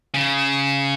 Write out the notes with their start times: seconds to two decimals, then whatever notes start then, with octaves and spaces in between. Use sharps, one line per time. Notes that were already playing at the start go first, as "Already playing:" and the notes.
0.14 C#3